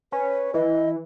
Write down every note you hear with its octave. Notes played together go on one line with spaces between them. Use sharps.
C#4 B4
E3 D#5